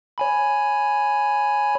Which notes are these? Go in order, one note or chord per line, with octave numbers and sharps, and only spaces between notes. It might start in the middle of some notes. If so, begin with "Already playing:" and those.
C#5 G#5 B5